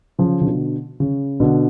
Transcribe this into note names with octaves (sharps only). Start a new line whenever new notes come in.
C#3 F3
C#3
B2 D3
C#3
B2 D3